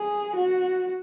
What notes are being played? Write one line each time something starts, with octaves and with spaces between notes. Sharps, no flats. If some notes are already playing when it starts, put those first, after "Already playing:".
Already playing: G#4
F#4